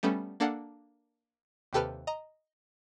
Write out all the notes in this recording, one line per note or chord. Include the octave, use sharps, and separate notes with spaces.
G3 A3 B3 C#4 A4
A#3 D4 A4 F5 F#5
D#2 C3 G4 A4 B4 F6
D#5 A#5